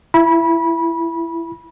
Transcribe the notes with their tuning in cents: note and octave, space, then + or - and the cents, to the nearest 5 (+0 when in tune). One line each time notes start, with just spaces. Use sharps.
E4 +20 B5 -25